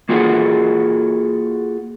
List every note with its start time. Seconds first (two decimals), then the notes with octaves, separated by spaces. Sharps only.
0.09 A#3 F4 F#4 G#4 A4